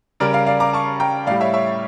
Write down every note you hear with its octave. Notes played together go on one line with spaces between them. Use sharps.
C#3 G3 A#4 D5
D5 F5
D5 F5
A#5 D6
A5 C#6
G5 A#5
A2 G3 D5 F5
C#5 E5
C#5 E5